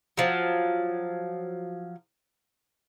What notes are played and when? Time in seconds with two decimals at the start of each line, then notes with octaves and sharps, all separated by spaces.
0.17 F3 F#3